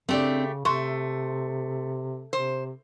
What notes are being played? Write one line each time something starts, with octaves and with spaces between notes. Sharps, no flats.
C#3 A3 C4 D4 G4 D5
C3 A3 C5 C6 C#6
C3 C5